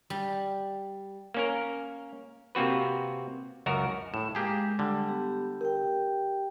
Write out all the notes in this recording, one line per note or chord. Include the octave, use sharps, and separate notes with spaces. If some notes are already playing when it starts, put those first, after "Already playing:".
G3
A#3 C#4 A#4
C3 A#3 C4 F#4 B4
C#2 F#2 F#4 A#4
A2 E7
G#3 A#3 G4 G#4
D3 G3
B3 G4
G4 A#4 G5